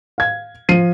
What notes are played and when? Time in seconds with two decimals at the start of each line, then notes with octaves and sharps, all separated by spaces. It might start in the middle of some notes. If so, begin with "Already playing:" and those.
0.18 F5 G#6
0.69 F3 C7 D#7